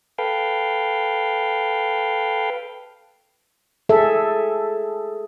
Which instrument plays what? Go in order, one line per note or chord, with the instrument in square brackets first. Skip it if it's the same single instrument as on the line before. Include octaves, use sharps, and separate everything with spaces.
[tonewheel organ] A4 B4 F5 G5
[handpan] G#4 A4 E5